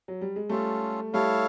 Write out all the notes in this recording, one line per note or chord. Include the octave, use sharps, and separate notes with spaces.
F#3
G3
G#3
G3 A3 C#4 F4 A4
G3 A3 E4 A4 C#5 F5